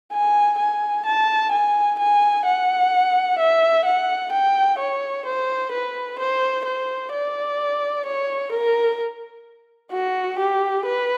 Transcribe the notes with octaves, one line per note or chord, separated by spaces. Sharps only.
G#5
G#5
A5
G#5
G#5
F#5
E5
F#5
G5
C#5
C5
B4
C5
C5
D5
C#5
A#4
F#4
G4
B4